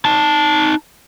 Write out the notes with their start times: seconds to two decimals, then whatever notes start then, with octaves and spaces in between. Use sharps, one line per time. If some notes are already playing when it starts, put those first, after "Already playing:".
0.05 D#4 A5